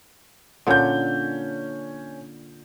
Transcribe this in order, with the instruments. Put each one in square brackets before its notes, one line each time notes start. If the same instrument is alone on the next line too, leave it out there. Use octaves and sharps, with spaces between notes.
[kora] A#2 D3 [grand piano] C#4 G6